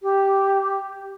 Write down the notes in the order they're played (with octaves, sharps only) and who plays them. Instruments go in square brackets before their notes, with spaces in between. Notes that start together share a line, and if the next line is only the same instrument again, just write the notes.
[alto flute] G4